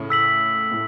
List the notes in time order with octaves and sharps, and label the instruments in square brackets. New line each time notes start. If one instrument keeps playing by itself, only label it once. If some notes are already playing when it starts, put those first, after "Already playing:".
Already playing: [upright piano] A2 C#3
[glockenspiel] E6 B6 F#7
[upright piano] A2